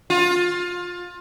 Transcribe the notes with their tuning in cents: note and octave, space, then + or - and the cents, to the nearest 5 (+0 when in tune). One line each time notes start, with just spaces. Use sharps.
F4 +20